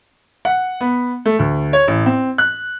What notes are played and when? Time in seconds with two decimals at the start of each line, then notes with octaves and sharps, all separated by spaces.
0.45 F#5
0.81 B3
1.25 A3
1.39 D2
1.73 C#5
1.88 A1
2.06 C4
2.38 F#6